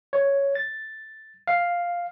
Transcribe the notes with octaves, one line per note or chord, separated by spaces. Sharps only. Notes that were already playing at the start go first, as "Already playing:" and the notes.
C#5
A6
F5